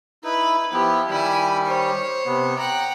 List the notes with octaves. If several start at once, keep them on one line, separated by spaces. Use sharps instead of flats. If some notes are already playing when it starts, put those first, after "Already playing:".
D#4 E4 B4
F3 B3 E4 G4
D#3 G3 E4 G4 G#5
C5 C#5
C3 B3
F#5 G5 A#5